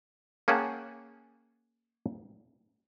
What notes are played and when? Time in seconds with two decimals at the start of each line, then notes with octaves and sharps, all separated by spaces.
0.48 A#3 C#4 G#4 F#5 G5 A5